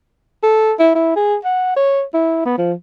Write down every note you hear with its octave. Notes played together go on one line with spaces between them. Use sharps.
A4
E4
E4
G#4
F#5
C#5
E4
B3
F3